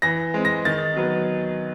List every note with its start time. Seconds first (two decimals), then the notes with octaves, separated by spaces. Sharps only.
0.02 E3 A#6
0.34 G#3 C4
0.45 A#6
0.65 D#3 A6
0.97 F#3 B3